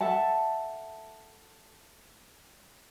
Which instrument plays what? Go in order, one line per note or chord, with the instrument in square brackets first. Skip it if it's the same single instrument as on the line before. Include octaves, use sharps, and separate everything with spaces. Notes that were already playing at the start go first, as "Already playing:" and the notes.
[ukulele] A4 E5 F#5 A5